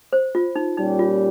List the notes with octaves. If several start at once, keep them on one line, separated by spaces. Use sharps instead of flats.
C5
F4
D#4
A#2 G3 C#4 D#4 G4
F4